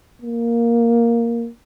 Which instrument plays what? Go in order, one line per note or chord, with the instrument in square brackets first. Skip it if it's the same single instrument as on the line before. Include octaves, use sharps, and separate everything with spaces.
[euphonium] A#3